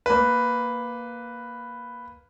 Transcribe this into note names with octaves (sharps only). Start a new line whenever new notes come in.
A#3 B4